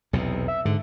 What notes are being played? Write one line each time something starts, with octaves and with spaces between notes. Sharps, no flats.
B1 E2 C3
E5
G#2 D3